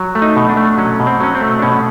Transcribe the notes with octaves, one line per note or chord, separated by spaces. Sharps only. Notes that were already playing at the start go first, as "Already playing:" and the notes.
Already playing: F#3
A3
D#4
B2
D4
A3
F#3 C#4
B2
C4
F#3 C#4
C4
A3
D4
B2 C#4